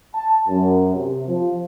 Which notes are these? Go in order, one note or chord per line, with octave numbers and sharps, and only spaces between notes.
A5
F#2
C3
F3